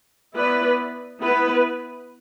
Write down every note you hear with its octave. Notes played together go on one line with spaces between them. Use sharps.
B3 E4 B4 D5
B3 E4 B4